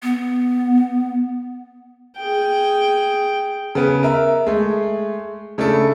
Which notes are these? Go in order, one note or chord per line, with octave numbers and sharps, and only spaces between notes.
B3
G#4 G5
C#3 B3
A#4 E5
G#3 A3
C#3 A3 D4 E4 A4